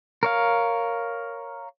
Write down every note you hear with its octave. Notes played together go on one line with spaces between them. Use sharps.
A#4 C#5 F5